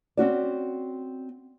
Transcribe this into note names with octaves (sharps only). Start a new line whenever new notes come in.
C4 C#4 F#4 D5